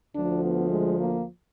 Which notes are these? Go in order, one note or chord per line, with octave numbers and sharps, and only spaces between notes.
D2 D3 F3 D4
B3
G#3
A#3